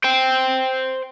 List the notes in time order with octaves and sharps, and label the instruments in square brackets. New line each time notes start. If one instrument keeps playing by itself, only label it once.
[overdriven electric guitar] C5 G5